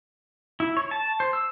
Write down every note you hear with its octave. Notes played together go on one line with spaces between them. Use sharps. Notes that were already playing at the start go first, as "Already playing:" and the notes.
E4
C#5
A5
C5
E6